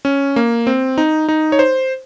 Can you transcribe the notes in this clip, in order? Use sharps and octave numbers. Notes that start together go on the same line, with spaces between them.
C#4
A#3
C4
D#4
D#4
C#5
C5